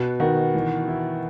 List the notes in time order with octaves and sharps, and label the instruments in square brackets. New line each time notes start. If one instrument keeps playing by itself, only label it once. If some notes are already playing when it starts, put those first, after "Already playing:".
Already playing: [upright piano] B2 [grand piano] B4
[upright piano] D#3 [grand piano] F#4
[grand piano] E3
E4